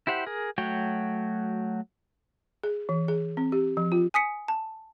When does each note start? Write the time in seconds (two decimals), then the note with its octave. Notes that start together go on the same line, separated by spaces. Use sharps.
0.07 E4 G4 C5 F#5
0.26 G#4 A#4
0.58 F#3 A3 F#4 C#5 G5
2.63 G#4
2.89 E3
3.08 G#4
3.37 C4
3.52 G4
3.77 F3
3.92 F4
4.14 G#5 D#6 B6 C#7
4.48 A5